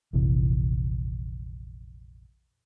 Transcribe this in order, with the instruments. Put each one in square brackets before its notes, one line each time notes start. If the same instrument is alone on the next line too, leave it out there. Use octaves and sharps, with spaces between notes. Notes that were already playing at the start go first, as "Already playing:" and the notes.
[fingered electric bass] F1 A#1 C3 E3